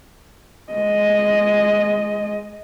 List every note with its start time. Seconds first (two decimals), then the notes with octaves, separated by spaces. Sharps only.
0.73 G#3 D#5